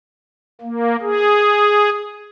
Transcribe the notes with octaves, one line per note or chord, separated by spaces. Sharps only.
A#3
G#4